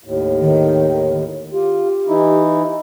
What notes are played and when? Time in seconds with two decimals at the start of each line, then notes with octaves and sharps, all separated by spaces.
0.04 D#2 A2
0.41 D#3
1.53 F4 G4
2.08 E3 D#4 E4